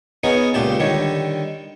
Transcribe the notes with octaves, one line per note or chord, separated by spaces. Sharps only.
B3 D#4 G#4 A#4 C#5
C#2 A#2 G4 A5
D3 D#3 G3 C#5